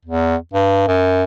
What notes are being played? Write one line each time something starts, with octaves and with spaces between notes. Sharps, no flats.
E2
G2
F#2